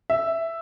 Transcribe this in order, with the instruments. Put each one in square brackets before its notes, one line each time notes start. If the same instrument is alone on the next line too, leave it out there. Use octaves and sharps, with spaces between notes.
[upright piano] E5